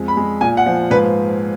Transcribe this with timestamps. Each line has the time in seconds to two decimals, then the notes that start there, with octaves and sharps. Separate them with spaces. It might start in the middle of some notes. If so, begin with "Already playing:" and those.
Already playing: F2 G#3
0.08 B5
0.17 G#3
0.41 A#2 G#5
0.57 F#5
0.66 F3
0.91 G#2 B4